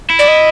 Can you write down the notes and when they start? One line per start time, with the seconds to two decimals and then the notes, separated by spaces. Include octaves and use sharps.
0.10 E4
0.19 D5
0.28 D#5